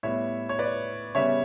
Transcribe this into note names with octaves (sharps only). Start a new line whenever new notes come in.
A2 G3 B3 C#5 E5
C#5
B4 D5
C#3 G3 B3 C#5 E5